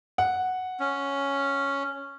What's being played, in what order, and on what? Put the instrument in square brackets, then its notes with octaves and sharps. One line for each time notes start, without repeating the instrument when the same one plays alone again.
[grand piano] F#5
[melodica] C#4